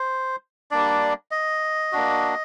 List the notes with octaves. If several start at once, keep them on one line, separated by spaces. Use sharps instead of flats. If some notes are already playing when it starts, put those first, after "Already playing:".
Already playing: C5
G3 A#3 D4 D5
D#5
A#3 D4 F#4